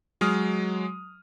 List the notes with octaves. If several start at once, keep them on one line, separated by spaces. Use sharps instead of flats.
F#3 G#3 D#6 F6